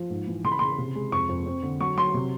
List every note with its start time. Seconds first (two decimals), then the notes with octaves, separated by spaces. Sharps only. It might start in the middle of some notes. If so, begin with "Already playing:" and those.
Already playing: F3
0.10 G#2
0.27 E3
0.44 C#3 C6
0.52 B5
0.59 C#3 C6
0.78 C3
0.95 G#3
1.12 F2 C#6
1.29 F2
1.46 C4
1.63 D3
1.80 F#3 C#6
1.97 F#3 C6
2.14 C3